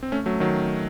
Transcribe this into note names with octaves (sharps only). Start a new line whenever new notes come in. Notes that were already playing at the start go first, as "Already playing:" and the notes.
C4
A3 C#4
F#3 A3
D#3 F#3